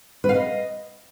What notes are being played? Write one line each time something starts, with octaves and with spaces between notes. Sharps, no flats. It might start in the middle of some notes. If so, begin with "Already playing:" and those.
B4
F5
D#5